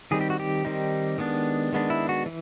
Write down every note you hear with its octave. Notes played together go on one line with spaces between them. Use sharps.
D#3 G3 C4 D#4 G#4
G4
F#4
G4
D#3 G3 C4 D#4
D#3 G#3 B3 D4
D#3 G#3 B3 D4
E4
F#4
E3